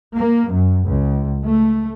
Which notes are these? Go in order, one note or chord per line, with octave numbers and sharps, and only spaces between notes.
A#3
F#2
C#2
A3